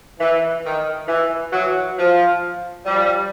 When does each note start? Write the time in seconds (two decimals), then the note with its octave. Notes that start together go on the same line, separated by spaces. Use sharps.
0.19 E3
0.64 D#3
1.08 E3
1.52 E3 F#3
1.98 F3
2.85 F3 G3